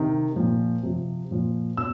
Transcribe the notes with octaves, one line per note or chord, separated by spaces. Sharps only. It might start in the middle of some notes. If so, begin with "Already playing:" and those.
Already playing: C3 D#3
A#2 F3
C3 F3
A#2 F3
B2 E6